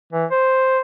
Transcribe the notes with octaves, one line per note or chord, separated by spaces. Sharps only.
E3
C5